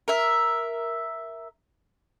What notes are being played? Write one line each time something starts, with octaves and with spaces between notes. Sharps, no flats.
A#4 E5